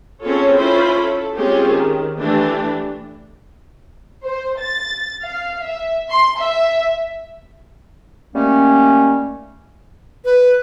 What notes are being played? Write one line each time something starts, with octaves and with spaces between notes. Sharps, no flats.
C4 C#4 F4 G#4 A4 C#5
C#4 E4 F4 C5 B5
A4
G#3 C4 C#4 F4 G4 G#4
D#3
E3 A3 D4 G4
C5
A6
F5
E5
C6
E5
D#3 G3 A3 A#3 C#4
B4